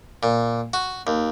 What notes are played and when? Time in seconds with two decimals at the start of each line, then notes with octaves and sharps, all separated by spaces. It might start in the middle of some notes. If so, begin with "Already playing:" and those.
0.23 A#2
0.73 F#4
1.07 D#2